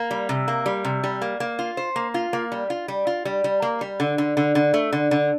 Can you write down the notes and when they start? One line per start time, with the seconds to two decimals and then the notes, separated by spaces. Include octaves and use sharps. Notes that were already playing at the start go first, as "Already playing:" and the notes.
Already playing: A#3
0.11 G3
0.29 C3
0.48 A#3
0.66 G3
0.85 C3
1.04 G3
1.22 A#3
1.40 A#3
1.59 F4
1.77 C5
1.96 A#3
2.14 F4
2.33 A#3
2.52 G3
2.70 F4
2.88 G3
3.07 F4
3.25 G3
3.44 G3
3.62 A#3
3.81 G3
4.00 D3
4.18 D3
4.37 D3
4.55 D3
4.74 A3
4.93 D3
5.11 D3